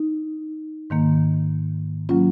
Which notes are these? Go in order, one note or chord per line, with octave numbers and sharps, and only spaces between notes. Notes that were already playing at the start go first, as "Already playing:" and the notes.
Already playing: D#4
G#2 D#3 A#3
F#3 A#3 C#4 F4